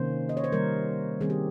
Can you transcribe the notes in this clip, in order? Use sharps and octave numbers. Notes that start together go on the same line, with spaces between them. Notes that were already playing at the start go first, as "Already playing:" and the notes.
Already playing: C3 D#3 A#3 C#4 C5
D#5
C#5
C5
D#3 G3 A#3 A#4
D#3 G3 C4 G#4
G4